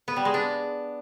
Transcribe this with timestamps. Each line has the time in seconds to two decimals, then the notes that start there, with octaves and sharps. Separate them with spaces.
0.08 B3
0.16 G3
0.25 G#3
0.34 D4